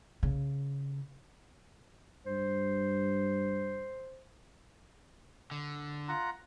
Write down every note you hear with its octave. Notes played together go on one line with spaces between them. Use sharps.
C#3
G2 C5
D3
F4 F#5 A#5